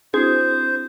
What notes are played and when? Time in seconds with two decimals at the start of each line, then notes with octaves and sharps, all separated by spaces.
0.14 C4 D4 E4 F#4 G#4 C5